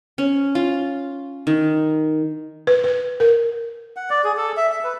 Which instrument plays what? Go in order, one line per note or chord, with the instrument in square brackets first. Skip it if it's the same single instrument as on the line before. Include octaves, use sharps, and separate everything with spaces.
[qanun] C#4
F4
D#3
[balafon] B4
B4
A#4
[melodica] F#5
D5
G#4
A4
E5
E5
B4